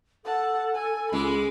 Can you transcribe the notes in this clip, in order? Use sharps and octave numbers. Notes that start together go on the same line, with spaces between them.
A4 F#5 A5
G#5
C#2 G#3 B5 D6